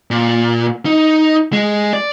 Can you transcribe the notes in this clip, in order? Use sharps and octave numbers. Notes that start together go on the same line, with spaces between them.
A#2
D#4
G#3
D5